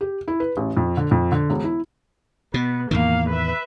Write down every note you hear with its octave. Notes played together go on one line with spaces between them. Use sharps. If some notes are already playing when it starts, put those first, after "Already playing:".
G4
E4
B4
A1
F2
D3
F2
D3
E1
E4
B2 B3
E2 A2 D#3 A#3 F5
B4 E5